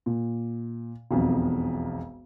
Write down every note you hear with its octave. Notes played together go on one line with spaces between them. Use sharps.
A#2
E1 B1 F2